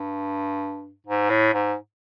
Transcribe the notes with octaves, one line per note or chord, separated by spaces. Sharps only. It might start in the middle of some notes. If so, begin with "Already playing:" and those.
Already playing: G2
G#2
A2
G#2